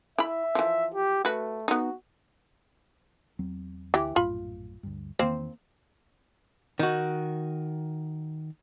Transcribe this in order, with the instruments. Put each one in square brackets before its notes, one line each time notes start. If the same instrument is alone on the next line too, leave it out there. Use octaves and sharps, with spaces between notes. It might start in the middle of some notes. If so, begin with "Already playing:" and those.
[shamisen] E4 B5 [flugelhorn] E5
[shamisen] E3 F3
[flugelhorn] G4
[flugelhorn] A3 [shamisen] F#4 B4
[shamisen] B3 D#4 [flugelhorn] F#4
[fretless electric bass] E2 F#3 C4
[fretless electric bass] D2 [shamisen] E3 G4
[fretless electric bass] A#1 F#2 A2 [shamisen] F4 B5
[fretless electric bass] D2 G2
[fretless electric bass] E2 D#3 [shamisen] A#3 C4 C5
[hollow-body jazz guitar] D#3 F#4